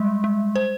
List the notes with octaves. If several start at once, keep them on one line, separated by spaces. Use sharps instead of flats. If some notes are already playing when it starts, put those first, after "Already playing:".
Already playing: G3 G#3
G#3
C5